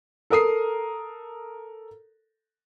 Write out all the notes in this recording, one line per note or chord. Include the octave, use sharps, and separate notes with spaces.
A4 A#4 D#6 C7